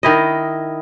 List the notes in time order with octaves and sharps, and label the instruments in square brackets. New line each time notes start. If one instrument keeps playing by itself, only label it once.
[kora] D#3 E4 D#5